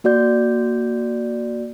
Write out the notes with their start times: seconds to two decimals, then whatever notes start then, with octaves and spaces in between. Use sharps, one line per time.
0.04 A#3 F#4 D5 G6